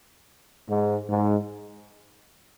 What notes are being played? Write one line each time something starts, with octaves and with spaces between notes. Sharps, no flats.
G#2
G#2